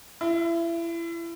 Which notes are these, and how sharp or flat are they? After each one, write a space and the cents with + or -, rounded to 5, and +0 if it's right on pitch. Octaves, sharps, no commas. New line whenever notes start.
E4 +30